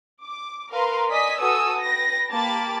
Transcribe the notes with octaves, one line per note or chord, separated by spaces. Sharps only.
D6
A#4 B4 F5 C6
D5 D#5 G#5 D#6 B6
F#4 A4 B4 G#5 D#6 E6
B4 G5 A#6
A#3 G4 A5 B5 D6 A6